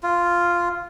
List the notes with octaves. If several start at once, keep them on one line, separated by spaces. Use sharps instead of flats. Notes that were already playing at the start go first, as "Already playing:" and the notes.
F4